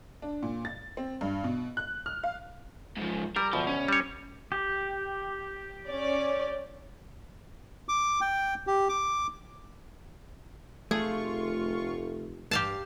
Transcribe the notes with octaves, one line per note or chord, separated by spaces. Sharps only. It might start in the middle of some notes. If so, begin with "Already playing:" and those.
D4
A#2
A6
C4
G2
B2
F#6
F6
F5
G#2 F3
G3 A#4
D2 B2 F3
C#4
G3 C#5
G4
C#4 D5
D6
G5
G4
D6
F1 A3 F4 G#4 C#6
G2 G4 F5 A5